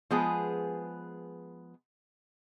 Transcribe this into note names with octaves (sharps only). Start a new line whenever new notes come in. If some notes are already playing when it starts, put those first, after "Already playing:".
F3 G#3 B3 G#4 B4